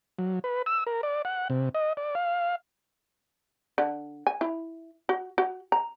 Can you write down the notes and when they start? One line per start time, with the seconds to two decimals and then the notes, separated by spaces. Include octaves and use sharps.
0.19 F#3
0.44 B4
0.66 E6
0.87 A#4
1.03 D5
1.25 F#5
1.50 C3
1.75 D#5
1.97 D5
2.15 F5
3.78 D3
4.27 G#5
4.41 E4
5.09 F#4
5.38 F#4
5.72 A#5